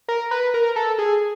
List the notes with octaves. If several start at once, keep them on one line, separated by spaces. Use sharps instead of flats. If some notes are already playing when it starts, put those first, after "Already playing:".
A#4
B4
A#4
A4
G#4